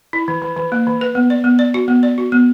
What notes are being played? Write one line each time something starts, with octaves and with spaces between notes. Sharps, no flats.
E4
E3
E3
E3
A#3
E3
B4
B3
D5
B3
D5
F#4
B3
D5
F#4
B3